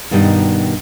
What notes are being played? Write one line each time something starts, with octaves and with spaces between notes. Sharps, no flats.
G2 B2 D#3 G3 C4 D#4